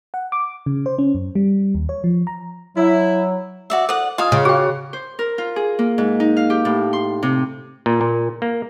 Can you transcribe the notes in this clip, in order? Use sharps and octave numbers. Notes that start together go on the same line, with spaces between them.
F#5
D6
C#3
C5
C#4
F#2
G3
D#2
C#5
F3
A#5
F#3 E4
F#4 D5 E5
A4 C5 D5 F#5
F4 D#5 F5 G#5 A#5 D#6
C#3
F#4 G#4 G5
C5
A#4
F4
G#4
A#3
G#2
D#4
F5
G4
A2
C6
C3
A#2
A#2
A#3